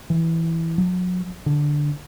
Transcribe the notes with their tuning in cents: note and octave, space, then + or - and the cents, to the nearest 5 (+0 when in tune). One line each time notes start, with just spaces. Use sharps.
E3 -5
F#3 -30
D3 +0